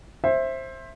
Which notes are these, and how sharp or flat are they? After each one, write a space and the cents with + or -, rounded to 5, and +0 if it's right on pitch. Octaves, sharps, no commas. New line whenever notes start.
C5 +20 E5 +0